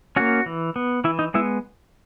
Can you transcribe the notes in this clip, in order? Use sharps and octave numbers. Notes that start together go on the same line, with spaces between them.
A#3 C#4 F#4
E3
B3
E3 E4
D#4
G#3 B3 E4